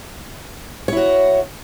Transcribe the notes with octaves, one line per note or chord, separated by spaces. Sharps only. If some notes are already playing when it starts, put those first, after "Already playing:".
E4 F#4 C#5